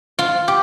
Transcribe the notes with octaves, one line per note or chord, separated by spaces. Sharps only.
F4
G4